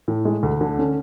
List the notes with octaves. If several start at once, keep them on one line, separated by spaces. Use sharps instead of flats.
A2
G#3
D2
D3
C#4